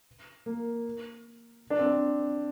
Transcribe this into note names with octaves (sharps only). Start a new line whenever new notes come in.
A#3
D4
C4
D4